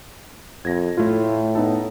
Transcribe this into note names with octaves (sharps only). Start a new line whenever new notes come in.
F2 G#6 A#6
A2 A3 E4 F4
B3 D#4 A4